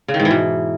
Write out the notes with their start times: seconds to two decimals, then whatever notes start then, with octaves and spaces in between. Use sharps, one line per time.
0.08 C#3
0.14 D#3
0.20 G#2
0.25 E3
0.31 B2